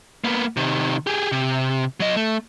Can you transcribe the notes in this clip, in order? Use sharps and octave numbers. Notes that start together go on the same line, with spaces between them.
A#3 B3
C3 D#3
G4 G#4
C3
F#3 D#5
A3